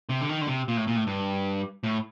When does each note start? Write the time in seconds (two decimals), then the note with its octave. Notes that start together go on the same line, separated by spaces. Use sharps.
0.09 C3
0.21 D3
0.29 D#3
0.41 D3
0.48 C3
0.68 A#2
0.77 A2
0.87 A#2
0.96 A2
1.07 G2
1.84 A2